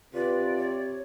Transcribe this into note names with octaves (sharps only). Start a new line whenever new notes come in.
C3 F4 B4 D5
C#5